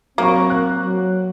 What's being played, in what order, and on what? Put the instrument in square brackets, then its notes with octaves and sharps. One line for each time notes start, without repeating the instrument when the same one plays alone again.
[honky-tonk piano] F#3 A#4 C#6 [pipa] A#3 [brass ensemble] C4
[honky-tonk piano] F#6
[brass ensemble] F#3